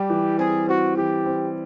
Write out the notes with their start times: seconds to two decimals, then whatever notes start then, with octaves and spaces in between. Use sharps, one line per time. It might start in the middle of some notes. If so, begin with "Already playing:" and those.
Already playing: G3 G4
0.10 E3
0.38 C4 G#4
0.68 C4 F#4
0.96 E3 G4
1.26 C4